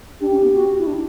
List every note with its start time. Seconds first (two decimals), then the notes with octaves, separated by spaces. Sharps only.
0.21 D4 G4
0.32 C#4
0.43 B3
0.54 F#4
0.78 E4
0.87 D4